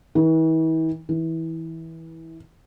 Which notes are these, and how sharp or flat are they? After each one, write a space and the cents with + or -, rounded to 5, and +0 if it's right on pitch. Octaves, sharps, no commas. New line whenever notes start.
E3 -40
E3 -20